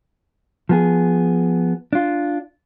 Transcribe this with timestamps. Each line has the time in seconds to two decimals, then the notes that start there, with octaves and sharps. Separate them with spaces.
0.69 F3 B3 G#4
1.93 D4 F4